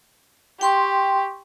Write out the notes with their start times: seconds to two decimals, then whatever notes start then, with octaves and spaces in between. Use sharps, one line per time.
0.61 G4 G5 C6 C#6